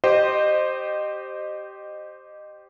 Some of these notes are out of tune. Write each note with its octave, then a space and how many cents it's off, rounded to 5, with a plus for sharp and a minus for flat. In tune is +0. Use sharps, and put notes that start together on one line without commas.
G4 -15 C5 +0 D#5 -25